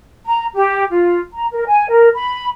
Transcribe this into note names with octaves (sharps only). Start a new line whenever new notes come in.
A#5
G4
F4
A#5
A#4
G#5
A#4
B5